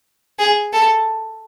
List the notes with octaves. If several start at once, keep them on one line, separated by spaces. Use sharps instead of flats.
G#4
A4